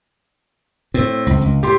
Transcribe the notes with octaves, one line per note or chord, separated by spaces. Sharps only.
A2 C4
C#2
C#2
A2 G4 C6